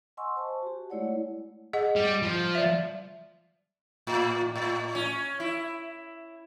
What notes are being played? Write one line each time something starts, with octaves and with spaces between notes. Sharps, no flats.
D#5 F#5 G#5 C6 C#6 E6
C5 A5
F#4 G4
G#3 A3 E4 C#5 D5 F#5
G#4 D#5 F#5
G3
F3
D5 E5
A2
A2
C#4
E4